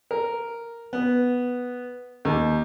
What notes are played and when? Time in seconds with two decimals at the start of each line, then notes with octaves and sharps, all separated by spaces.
0.11 A#4
0.93 B3
2.25 D#2